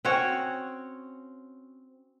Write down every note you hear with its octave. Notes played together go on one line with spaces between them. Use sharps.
C4 C#4 F#4 C#5